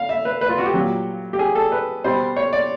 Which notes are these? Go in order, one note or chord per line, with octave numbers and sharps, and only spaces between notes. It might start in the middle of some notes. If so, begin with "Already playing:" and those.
Already playing: F5
E5
B4
B4
F4
F#4
G4
A#2 F#3
G4
G#4
A4
B4
B2 G3 C5
C#5
D5